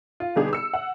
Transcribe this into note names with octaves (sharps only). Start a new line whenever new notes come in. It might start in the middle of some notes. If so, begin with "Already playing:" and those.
F4
B2 D3 G3 D#4 G4 G#4
E6 C#7
F#5